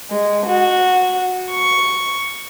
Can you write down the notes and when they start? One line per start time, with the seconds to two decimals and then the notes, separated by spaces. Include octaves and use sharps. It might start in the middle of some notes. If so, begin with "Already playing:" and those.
0.10 G#3
0.46 F#4
1.52 C#6